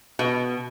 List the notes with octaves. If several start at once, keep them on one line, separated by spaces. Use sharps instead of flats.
B2